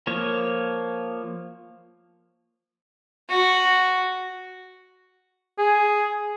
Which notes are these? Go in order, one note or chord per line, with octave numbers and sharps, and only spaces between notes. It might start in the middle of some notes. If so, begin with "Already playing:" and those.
F3 A#3 C#5
F#4
G#4